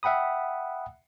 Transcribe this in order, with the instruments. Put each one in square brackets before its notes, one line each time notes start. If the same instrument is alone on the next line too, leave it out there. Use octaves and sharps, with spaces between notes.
[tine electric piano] E5 F#5 G5 B5 D#6